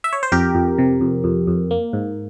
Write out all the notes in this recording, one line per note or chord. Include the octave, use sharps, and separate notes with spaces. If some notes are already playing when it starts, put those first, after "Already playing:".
E5
C#5
C5
F2 G4 A#4
F2
C3
F2
F2
F2
A#3
G#2